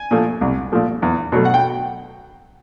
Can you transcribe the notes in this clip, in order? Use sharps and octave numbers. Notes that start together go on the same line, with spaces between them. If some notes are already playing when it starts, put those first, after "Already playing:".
Already playing: G#5
A#2 F3 A3
C2
A#2 F3 A3
E2
B2 F#3 A3
F#5
G5